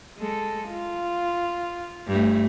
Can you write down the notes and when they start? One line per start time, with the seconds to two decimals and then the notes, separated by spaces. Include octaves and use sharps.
0.18 G#3 A4
0.70 F4
2.07 G2 A3